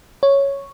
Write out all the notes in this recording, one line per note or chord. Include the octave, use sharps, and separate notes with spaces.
C#5